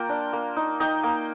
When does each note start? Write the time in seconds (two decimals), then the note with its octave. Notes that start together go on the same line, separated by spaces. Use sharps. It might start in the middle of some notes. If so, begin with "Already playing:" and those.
Already playing: A#3 F4 G5 A#5
0.09 D4
0.33 A#3
0.56 D#4
0.80 D#4 D#5 G5
1.03 A#3